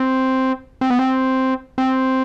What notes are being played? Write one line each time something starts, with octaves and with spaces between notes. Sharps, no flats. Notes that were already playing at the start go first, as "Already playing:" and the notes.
Already playing: C4
C4
B3
C4
C4